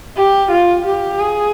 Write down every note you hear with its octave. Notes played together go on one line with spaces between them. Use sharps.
G4
F4
G4
G#4